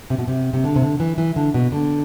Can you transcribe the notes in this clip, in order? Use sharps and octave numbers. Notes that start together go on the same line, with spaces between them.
C3
B2
C3
C3
D3
C3
D3
E3
E3
D3
B2
D3